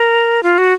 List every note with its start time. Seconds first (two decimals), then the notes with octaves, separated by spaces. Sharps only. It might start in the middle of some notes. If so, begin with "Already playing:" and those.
Already playing: A#4
0.43 F4
0.58 F#4